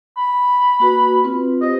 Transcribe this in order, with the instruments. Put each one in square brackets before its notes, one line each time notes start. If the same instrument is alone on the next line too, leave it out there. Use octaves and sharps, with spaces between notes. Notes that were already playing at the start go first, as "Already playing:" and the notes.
[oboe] B5
[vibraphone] A#3 F#4 B4
C4 F4 B4
[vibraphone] G4 C5 [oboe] D#5